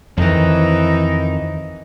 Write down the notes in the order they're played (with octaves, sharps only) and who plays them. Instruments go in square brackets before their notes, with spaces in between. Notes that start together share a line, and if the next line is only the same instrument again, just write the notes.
[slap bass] F2 D#3 [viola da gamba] E3 D#4